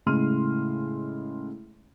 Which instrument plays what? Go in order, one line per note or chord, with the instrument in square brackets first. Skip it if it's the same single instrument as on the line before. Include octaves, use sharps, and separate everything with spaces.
[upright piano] A2 C#3 G#3 C6 F6 D#7